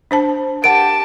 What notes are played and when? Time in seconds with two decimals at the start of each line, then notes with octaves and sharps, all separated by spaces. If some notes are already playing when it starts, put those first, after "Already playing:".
0.11 D4 C5 A5
0.64 G4 A#4 F#5 A5 D7